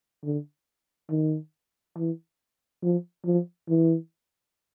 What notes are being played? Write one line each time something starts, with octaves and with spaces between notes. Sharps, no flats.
D3
D#3
E3
F3
F3
E3